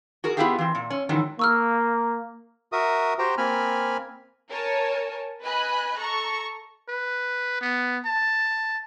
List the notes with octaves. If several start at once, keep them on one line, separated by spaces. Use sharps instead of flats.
F#4 G#4 A#4
B3 C#4 E4 F4 G4 G#4
E3 C4
A#2
C#4
G#2 D#3 E3 F#3
A#3 C#6 E6 F6
F#4 A#4 E5 D#6
F#4 G4 C5 G5 A#5
A#3 C4 G#5 B5 F6
A#4 C#5 G#5 A5
B4 D#5 G#5 B5 F#6
A4 A#5 C#6
B4
B3
A5